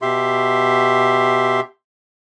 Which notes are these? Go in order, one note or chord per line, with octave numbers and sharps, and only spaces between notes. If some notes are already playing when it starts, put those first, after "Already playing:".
B2 G4 E5 C6